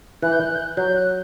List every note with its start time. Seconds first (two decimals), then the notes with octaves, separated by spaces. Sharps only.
0.22 E3 F#6
0.32 G6
0.41 F#6
0.55 G6
0.59 F#6
0.77 F#3 G6
0.96 F#6